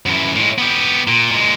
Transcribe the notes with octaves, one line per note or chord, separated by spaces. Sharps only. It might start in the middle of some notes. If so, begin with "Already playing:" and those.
F#2 E3
A2 G#3
B3 G4
A#2
A#2 G#3